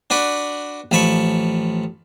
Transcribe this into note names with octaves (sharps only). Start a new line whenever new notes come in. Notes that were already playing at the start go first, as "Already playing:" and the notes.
D4 F#4 B4 D5
A1 F3 A5 B5 C#6